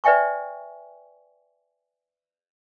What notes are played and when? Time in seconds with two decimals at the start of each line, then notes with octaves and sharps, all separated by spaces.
0.04 B4 D5 E5 G5 G#5 C#6